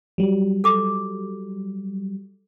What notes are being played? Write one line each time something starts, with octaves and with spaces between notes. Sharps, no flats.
F#3 G3
A4 D6